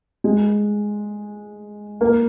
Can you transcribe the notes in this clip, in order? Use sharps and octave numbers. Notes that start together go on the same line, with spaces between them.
G#3
A#3